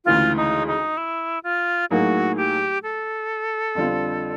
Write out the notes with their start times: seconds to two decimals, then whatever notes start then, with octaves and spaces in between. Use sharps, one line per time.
0.05 D2 C#3 E3 G#3 F4
0.37 D#4
0.67 D#4
0.97 E4
1.44 F4
1.91 A2 F#3 A#3 D#4 F#4 G#4
2.37 G4
2.83 A4
3.75 F2 D3 G3 C4 F4